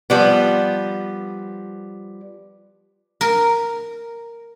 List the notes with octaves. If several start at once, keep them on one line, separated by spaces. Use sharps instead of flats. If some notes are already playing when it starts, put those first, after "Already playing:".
F3 G3 B3
A#4